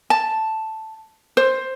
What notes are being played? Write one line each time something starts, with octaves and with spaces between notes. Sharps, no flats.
A5
C5